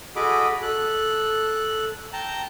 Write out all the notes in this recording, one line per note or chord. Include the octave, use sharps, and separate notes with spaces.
F#4 G#4 A4 D#5 B5 D6
A4 F#6
G5 A5 A#5